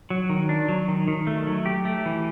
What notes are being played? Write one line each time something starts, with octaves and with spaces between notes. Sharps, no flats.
F#3
D#3
D4
F#3
D#3
D#3
A3
F#3
G4
A3
E3